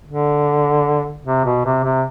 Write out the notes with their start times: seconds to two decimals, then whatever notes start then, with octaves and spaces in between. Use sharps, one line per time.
0.07 D3
1.25 C3
1.45 B2
1.65 C3
1.84 C3